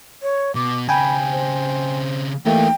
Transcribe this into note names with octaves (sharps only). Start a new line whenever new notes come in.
C#5
B2 D6
C#3 C4 G5 G#5 B5
C5
E3 A3 A#3 D#4 G4 G5